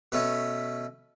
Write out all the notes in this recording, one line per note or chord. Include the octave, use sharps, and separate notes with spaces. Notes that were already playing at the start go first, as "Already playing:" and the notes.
B2 A3 C#4 B4